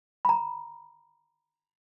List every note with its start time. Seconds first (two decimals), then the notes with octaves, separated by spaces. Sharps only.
0.25 A#5 B5